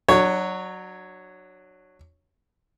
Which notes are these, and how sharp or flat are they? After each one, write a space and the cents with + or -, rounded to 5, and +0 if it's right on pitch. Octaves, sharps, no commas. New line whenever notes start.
F#3 +0 D4 +30 C#5 +0